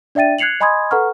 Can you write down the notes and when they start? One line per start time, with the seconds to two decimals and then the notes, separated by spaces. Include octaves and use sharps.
0.15 D4 D5 E5 G5 A6 D#7
0.39 F#6 G#6 C7 C#7 F7 F#7
0.60 D#5 G#5 B5 C6 D#6 G#6
0.91 A4 B4 F#5 A#5 C#6 F6